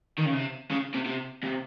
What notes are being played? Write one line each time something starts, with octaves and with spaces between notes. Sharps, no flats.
D#3
C#3
C3
C#3
C3
C3
C3